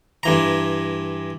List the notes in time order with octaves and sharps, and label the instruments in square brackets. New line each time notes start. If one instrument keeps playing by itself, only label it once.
[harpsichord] G2 E3 A#5